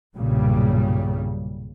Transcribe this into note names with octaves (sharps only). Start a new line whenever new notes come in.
B1 G2 A#2 C#3 G3